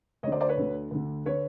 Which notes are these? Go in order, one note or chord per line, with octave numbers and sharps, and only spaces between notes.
D2 D3 C5 C#5 D5 D#5
C5 D5
B4 C#5
D2 D3
D2 D3
D3 B4 C#5